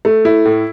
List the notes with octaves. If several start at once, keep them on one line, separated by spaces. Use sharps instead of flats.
A3
E4
A2